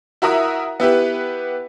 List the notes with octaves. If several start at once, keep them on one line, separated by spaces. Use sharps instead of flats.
E4 F#4 A#4 E5 A#5 D#6
B3 E4 G4 B4